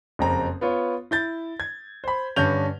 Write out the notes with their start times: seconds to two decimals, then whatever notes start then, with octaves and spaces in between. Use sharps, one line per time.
0.19 F#1 F2 C4 A#5
0.61 B3 F4 C#5
1.11 E4 G6 A6
1.60 G#6
2.04 C5 B5
2.36 G2 D3 C#4 B4 G6 F7